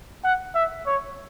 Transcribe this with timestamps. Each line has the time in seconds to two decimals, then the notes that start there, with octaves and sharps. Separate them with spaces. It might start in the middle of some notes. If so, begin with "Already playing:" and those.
0.24 F#5
0.55 E5
0.86 C#5